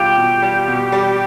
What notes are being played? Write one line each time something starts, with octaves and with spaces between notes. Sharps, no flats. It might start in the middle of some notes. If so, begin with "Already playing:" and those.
Already playing: B2 G3 F4 G4
B2
G3
B2
G3